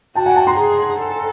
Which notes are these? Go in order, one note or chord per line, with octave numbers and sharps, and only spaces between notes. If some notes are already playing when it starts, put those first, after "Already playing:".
F#4 G5 A5
F#5 G#5
G5 A5
A#5 C6
G#4
A4